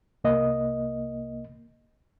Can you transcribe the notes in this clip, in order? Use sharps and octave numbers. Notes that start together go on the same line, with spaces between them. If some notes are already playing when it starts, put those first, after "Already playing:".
C2 A#3 D#5